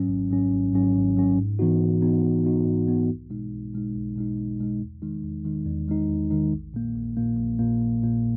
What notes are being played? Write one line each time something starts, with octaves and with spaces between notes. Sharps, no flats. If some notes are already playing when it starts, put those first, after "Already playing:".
Already playing: G#2 F#3 C#4
G#1
G#2 F#3 C#4
G#1
G#2 F#3 C#4
G#1
G#2 F#3 C#4
G#2
E3 B3 D#4 F#4
G#2
E3 B3 D#4 F#4
G#2
E3 B3 D#4 F#4
G#2
E3 B3 D#4 F#4
B1
B2 G#3 D#4
B1
B2 G#3 D#4
B1
B2 G#3 D#4
B1
B2 G#3 D#4
E2
D#3 G#3 D#4
E2
D#3 G#3 D#4
E2
D#3 G#3 D#4
E2
D#3 G#3 D#4
A#1
A#2 A#3
A#1
A#2 A#3
A#1
A#2 A#3
A#1
A#2 A#3